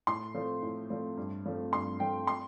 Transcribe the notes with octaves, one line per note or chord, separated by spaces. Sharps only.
A2 C6
F3 A3 C4
A2
F3 A3 C4
G2
F3 A3 C4
G2 C6
F3 A3 C4 G5
C6